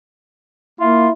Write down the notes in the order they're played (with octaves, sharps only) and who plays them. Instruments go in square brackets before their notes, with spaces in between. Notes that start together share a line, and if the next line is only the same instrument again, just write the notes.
[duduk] A#3 [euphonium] E4 [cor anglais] F4